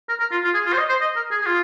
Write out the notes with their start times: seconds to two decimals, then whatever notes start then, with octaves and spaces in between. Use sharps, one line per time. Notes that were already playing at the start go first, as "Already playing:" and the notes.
0.09 A#4
0.20 A#4
0.31 F4
0.44 F4
0.54 G#4
0.66 F4
0.73 C5
0.78 D#5
0.89 C5
1.01 D#5
1.16 A#4
1.31 G#4
1.42 G#4
1.46 F4